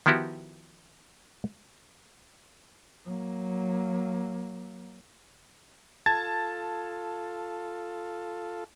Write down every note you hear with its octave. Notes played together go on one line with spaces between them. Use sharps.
D#3 F3 B3 E4 F#4 G4
F#3 A#3
F4 A4 A5 G#6 A6